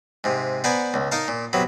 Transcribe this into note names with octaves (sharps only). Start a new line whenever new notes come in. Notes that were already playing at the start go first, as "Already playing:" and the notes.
G#2 C3
B3 C5 D5 F#5 G#5 A#5
C#2
D#4 A#4 F5 A5
A#2
C3 F#3 B3